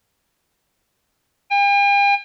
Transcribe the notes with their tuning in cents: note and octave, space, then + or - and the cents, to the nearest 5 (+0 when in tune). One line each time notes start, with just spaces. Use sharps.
G5 +45